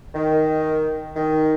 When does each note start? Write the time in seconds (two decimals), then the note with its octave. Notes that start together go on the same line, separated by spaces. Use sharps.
0.14 D#3
1.16 D#3